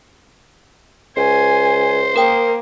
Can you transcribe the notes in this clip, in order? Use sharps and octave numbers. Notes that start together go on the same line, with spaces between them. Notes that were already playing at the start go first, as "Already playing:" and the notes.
C#2 C5 G#5
A#3 A#4 G5